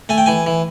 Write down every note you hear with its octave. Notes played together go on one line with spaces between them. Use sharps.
A3 G#5
G5
E3 G#5
E3